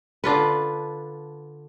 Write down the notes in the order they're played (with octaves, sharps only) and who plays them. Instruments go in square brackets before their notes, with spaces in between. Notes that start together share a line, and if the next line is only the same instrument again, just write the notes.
[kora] D3 D4 F4 B4